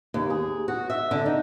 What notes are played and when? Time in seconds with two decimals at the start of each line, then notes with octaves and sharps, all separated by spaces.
0.14 D#2
0.30 G#4
0.68 F#4
0.90 E5
1.11 D3
1.26 D#4